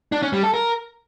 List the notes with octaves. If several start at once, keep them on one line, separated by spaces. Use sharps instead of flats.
D4
C#4
G3
A4
A#4